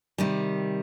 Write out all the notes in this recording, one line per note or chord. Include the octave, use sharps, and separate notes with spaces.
C3 D#3 G3